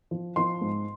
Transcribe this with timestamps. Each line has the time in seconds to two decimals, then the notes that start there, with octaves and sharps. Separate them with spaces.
0.11 F3
0.36 F3 C6
0.61 G#2